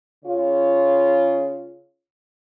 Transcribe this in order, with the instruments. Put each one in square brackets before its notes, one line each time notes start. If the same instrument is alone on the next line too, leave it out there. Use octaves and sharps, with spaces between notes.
[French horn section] C#3 F4 C#5